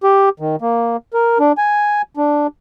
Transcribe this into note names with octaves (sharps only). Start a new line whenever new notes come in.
G4
D#3
A#3
A#4
D4
G#5
D4